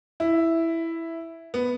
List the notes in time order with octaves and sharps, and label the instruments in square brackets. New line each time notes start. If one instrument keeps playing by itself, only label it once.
[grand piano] E4
B3